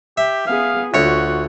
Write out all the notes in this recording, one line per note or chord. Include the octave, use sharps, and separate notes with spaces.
G4 E5
B3 G#4 F5
D2 F4 F#4 C#5